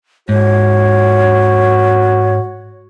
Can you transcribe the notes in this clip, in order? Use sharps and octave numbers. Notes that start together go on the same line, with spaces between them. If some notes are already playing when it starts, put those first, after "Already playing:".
G#2 F#4 C#5